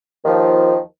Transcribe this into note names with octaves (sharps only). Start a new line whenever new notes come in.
D#2 D#3 F3